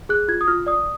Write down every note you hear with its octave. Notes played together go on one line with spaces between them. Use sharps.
G#4 F#6
F4 G#6
D#6
F4 F6
D5 D#6